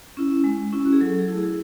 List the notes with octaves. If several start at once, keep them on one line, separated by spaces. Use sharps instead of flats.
C#4 E4
G#3
C#4 E4
F#4
G#4
F#3 A4
G#4
A3 E4
G#4